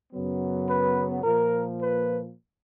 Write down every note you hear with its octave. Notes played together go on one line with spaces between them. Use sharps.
F#2 C#3 F#3 B3
B4
A#2 F3 A#3 A#4
B4